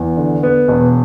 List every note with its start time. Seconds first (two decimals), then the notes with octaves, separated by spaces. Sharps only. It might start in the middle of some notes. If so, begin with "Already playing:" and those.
Already playing: E2
0.17 D3
0.43 B3
0.68 E1